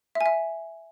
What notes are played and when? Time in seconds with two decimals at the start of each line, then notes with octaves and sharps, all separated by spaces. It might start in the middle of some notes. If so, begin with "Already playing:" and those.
0.15 E5
0.21 G#5
0.26 E5